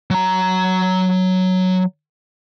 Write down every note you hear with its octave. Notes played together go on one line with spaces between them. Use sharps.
F#3 A#5